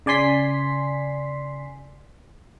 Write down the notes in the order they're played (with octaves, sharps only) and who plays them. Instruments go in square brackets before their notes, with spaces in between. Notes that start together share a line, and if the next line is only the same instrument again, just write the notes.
[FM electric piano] C#3 D5 G#5 C6 B6 C7